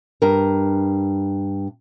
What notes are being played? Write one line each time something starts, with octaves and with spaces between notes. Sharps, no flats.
G2 A#4